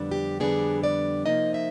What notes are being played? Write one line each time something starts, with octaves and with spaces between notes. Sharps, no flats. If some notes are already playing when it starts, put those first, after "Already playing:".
Already playing: F2 D3 G3 B3 D4
G4
F2 D3 G3 B3 D4 G#4
D5
C3 F3 A#3 D#4 D#5
E5